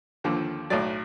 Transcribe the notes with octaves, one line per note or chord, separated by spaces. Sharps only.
D#2 D3 F3
B1 A2 F#3 D5